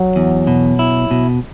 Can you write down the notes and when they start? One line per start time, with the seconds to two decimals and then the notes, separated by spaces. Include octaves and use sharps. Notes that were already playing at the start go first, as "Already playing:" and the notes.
Already playing: F#3
0.16 E2
0.47 B2
0.79 E4
1.11 B2